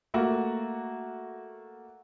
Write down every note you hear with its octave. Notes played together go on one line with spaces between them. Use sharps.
A3 A#3 F#4